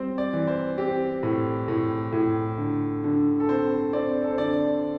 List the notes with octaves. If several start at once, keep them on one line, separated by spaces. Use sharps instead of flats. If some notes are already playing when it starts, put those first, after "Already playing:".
Already playing: G3 C4 C5
D5
E3
C5
C4 G4
A2
A2
A2
D3
D3
A4
C4 C5
C4 D5
A4
C5
D3 D5